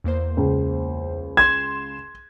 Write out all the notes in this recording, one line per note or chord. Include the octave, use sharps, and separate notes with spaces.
E2 A#3 C5
C#2
C6 G#6 E7